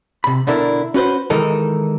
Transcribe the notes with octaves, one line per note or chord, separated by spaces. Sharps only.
C3 B5
B2 D3 D4 E4 A#4
C#4 F#4 B4 C5
D#3 E3 G#3 D#4 A4 A#4